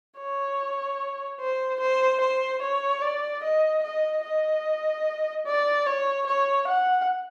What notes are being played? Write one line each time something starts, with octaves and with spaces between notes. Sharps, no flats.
C#5
C5
C5
C5
C#5
D5
D#5
D#5
D#5
D5
C#5
C#5
F#5